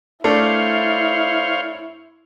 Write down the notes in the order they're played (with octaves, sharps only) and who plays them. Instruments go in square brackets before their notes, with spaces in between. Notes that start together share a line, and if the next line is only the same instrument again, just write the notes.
[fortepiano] A3 D4 [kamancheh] E4 [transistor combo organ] C5 C#5 F5